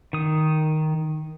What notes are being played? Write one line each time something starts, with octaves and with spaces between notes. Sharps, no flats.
D#3 D#6